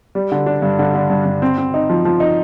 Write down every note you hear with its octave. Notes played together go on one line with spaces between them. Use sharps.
G3
D3
D4
G2
D3
D3
G2
G2
C4
C4
D#4
F3
F3
D#4